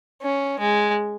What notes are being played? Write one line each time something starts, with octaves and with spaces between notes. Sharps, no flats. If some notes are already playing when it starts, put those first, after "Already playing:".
C#4
G#3